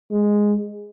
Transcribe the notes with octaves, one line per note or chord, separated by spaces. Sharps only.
G#3